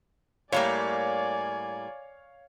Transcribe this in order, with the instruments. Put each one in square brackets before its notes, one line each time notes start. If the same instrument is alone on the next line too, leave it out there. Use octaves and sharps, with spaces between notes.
[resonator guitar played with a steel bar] A2 G3 A#3 [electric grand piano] C#5 F5 [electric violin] D5 G#5